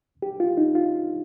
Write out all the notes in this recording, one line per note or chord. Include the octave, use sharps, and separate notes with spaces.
G4
F4
D#4
F4